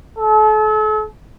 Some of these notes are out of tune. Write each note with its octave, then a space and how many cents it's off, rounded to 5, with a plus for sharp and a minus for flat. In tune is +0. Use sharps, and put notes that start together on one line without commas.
A4 -40